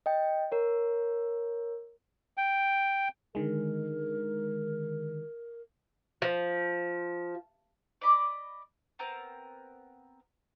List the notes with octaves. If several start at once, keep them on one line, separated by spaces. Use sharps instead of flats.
D#5 G5
A#4 C#5
G5
D3 D#3 G#3 A#4
F3
D5 D#5 B5 D6
B3 C4 A#4